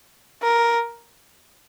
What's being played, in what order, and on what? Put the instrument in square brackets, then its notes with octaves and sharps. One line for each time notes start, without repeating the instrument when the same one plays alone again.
[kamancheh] A#4